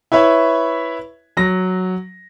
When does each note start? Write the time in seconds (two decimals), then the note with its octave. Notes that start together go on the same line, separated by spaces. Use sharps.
0.12 E4 B4 C#5 E5
1.37 F#3 A#6